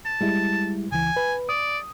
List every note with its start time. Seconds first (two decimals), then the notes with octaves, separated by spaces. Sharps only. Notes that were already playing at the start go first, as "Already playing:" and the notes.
0.06 A5
0.21 G3 G#3 E4
0.92 C#2 E3 G#5
1.16 B4
1.49 D5 D#6